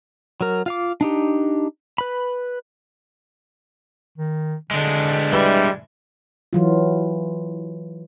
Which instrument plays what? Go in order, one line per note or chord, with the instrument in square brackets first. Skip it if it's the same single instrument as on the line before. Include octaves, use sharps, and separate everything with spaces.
[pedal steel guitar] F#3 A#4
F4 F5 D6
D4 D#4 G4
B4 B5
[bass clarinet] D#3
[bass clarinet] D3 [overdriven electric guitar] G#3 D4
[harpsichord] E3 [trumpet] G3
[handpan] E3 F#3 F4